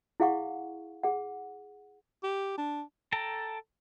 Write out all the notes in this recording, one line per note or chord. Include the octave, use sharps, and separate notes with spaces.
E4 G#4 F5 F#5 C#6
G#4 F#5
G4
D4
A4 G5 A5 A#5